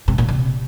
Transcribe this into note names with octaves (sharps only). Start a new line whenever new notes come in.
C3
A#2
C3